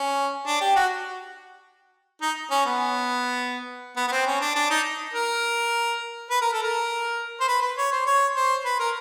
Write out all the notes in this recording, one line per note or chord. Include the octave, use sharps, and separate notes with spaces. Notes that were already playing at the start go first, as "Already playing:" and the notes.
Already playing: C#4
D4
G4
F#4
D#4
C#4
B3
B3
B3
C4
C#4
D4
D4
D#4
A#4
B4
A#4
A4
A#4
C5
B4
B4
C#5
C5
C#5
C5
B4
A#4